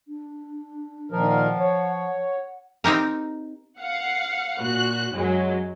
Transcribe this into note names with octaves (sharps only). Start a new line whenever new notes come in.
D4
A#2 D#3 F3 A#4
F#5
C#5
C4 D#4 G4 A#4
F5 F#5
A#2 F#4 F#6
F#2 F#3 G#3